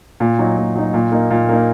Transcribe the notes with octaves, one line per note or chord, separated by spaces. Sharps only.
A#2
F#3 D#4
A#2
F#3 D#4
A#2
A#3 D#4
A#2
A#3 D#4